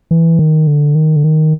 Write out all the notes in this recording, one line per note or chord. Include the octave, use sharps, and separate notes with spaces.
E3
D#3
D3
D#3
D3
D#3